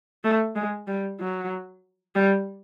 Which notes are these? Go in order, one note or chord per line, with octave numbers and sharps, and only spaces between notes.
A3
G#3
G3
F#3
G3